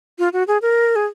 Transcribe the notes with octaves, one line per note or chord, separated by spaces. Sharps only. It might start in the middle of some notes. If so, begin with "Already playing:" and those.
F4
F#4
G#4
A#4
G#4